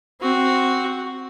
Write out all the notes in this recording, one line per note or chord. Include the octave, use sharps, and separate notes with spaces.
C4 F#4